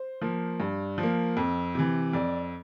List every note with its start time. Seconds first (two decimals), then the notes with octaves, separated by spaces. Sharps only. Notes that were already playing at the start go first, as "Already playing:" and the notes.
Already playing: C5
0.21 F3 A#3
0.60 G2
0.98 F3
1.03 A#3
1.37 F2
1.75 C3 E3
2.13 F2 D5